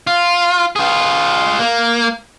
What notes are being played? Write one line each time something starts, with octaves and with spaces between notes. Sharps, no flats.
F4
F4 G#4
A#3